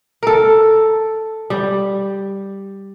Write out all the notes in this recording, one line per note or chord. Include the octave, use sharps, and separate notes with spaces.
A4 A#4
G3